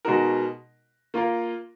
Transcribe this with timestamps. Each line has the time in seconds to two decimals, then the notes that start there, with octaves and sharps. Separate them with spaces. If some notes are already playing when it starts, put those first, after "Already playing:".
0.05 B2 G#3 D#4 F#4 A#4
1.14 A#3 F4 A#4